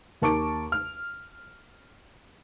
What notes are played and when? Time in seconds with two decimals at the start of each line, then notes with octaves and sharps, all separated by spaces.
0.22 D#2 A#4 A5 C#6 D6 D7
0.72 F6